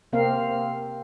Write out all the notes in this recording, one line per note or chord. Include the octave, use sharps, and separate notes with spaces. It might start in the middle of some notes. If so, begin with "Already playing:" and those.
C3 A#3 C4 A#4 F5